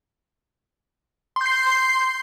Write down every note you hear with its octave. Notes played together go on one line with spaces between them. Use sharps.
C6 G6 C7